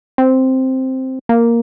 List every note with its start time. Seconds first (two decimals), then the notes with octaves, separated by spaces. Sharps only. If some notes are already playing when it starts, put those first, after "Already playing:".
0.18 C4
1.29 A#3